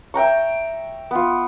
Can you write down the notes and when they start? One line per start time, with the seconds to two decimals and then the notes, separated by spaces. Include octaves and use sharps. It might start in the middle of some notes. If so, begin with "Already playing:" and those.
0.14 E5 G5 A#5 C#6
1.11 B3 F4